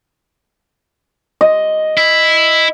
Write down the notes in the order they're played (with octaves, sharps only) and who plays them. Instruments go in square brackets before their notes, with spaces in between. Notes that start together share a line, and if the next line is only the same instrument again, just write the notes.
[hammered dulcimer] D#5
[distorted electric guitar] E4